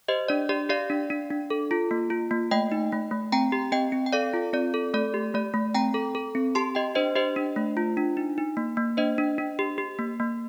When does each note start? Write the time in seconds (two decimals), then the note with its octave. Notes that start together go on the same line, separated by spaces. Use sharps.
0.08 G4 C5 D#5
0.28 D4 D5
0.49 G4 D5
0.69 G4 D5 F5
0.90 D4
1.10 D4
1.30 D4
1.50 A4
1.71 F4
1.91 A#3
2.10 F4
2.31 A#3
2.51 A3 D#5 G5
2.72 D#4
2.92 A3
3.11 A3
3.32 C4 G5 A#5
3.52 G4
3.72 C4 D#5 G5
3.92 C4
4.06 G5
4.13 A4 D5 F5
4.33 F4
4.53 C4 D5
4.74 A4
4.94 A3 D5
5.14 G4
5.34 A3 D5
5.54 A3
5.74 C4 G5 A#5
5.94 A4
6.15 A4
6.35 C4
6.55 G4 A5 C6
6.75 G4 D#5 G5
6.95 D4 C5 D#5
7.15 G4 C5 D#5
7.36 D4
7.56 A3
7.77 F4
7.97 D4
8.17 D#4
8.38 D#4
8.57 A#3
8.77 A#3
8.97 D4 C5 D#5
9.18 D4
9.38 D4
9.59 G4
9.78 G4
9.99 A#3
10.20 A#3